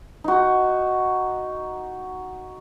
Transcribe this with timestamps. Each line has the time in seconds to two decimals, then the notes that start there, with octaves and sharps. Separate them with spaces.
0.24 D#4 F#4